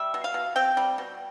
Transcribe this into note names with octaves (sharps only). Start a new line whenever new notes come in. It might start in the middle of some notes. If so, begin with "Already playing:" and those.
Already playing: G3 E5
B2
F5
B2
C4 G5
G3
B2